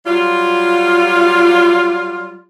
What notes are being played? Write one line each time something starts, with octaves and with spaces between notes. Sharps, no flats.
F#3 G3 F4